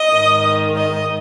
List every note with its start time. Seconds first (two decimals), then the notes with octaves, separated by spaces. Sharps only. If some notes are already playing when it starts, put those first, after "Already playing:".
Already playing: D#5
0.12 G#2 D#3
0.77 D#5